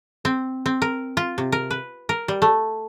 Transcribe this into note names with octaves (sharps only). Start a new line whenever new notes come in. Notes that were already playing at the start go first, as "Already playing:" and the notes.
C4
C4
A#4
F4
C3
A#4
B4
A#4
G3
A3